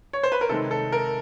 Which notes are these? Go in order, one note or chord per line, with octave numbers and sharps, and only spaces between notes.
C#5
C5
B4
A#4
C3 D#3 G#3 A4
A4
A#4